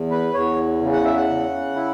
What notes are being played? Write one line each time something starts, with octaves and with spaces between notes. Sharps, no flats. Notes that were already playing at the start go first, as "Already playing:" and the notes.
Already playing: E2
B4
E2 C#5
C#3
F#5
E5
F#5
C#3
E4